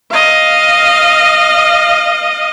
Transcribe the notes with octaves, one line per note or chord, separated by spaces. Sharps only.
D#5 F5